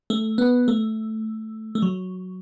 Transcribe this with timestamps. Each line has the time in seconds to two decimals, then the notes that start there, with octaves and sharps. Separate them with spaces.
0.10 A3
0.38 B3
0.68 A3
1.75 A3
1.82 F#3